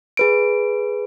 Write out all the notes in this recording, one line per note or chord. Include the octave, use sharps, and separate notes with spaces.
G#4 B4 D7